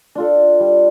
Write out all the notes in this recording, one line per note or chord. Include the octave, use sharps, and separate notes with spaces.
D4 F4 A4
G3